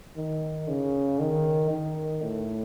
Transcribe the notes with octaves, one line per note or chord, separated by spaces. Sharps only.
D#3
C#3
D#3
D#3
A2